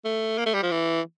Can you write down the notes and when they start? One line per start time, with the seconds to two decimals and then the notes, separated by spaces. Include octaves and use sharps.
0.05 A3
0.38 A#3
0.46 A3
0.54 G3
0.63 F3
0.71 E3